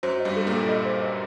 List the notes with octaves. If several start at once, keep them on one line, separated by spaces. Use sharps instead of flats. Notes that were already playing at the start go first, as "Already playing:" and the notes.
F#2 F#3 C5
D#5
G2 G3
A4
A#2 A#3
A4
D#5
C5
D#5